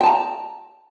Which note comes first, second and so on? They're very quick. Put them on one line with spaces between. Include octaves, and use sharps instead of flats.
G5 A5 A#5